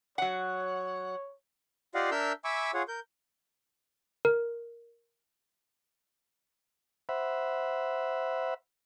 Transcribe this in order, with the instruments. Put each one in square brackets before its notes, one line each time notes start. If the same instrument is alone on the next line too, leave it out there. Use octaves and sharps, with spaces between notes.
[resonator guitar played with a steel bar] F#3 F#5 [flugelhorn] C#5
[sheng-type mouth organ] F4 G4 D5 D#5 F5 F#5
D4 A#4 E5 E6 F6 G6
E5 G#5 B5 C#6 D6 E6
F4 G#4 C#5 F#5
A#4 G6
[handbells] A#4
[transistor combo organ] C5 E5 F#5 B5